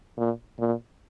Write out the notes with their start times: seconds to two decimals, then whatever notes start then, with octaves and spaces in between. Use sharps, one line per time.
0.17 A#2
0.59 A#2